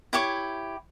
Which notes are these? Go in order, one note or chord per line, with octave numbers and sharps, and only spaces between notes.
E4 G4 C#5 D6